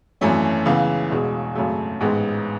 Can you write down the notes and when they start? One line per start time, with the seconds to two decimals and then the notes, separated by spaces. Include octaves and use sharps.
0.21 G#1 F#2 E3 A3 C#4
0.66 C#2 C#3 E3 B3
1.10 E1 E2 B2 G#3
1.55 G#1 F#2 C#3 F#3 A3
2.00 A1 G#2 G#3 B3